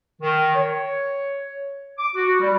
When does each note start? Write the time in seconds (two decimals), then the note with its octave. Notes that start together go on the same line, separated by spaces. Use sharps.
0.22 D#3
0.55 C#5
1.99 D6
2.15 F#4
2.41 G3